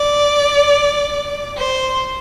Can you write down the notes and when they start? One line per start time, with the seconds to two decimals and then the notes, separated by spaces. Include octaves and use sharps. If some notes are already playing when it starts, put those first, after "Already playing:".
Already playing: D5
1.57 C5